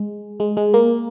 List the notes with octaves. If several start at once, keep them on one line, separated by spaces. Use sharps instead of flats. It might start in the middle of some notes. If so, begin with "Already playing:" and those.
Already playing: G#3
G#3
G#3
A#3